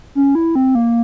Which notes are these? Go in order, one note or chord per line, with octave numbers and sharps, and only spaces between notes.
C#4
E4
C4
A#3